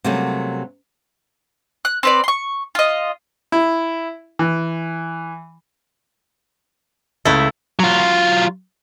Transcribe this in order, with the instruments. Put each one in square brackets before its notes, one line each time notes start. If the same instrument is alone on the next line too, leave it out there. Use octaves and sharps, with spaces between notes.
[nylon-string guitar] C3 F#3 G3 A3 A#3 C#4
[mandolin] F#6
C4 B4 D5
C6 C#6
F4 D#5
[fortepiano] E4
E3
[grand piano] C#2 C#3 [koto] A3 E4
[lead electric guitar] F#3 F4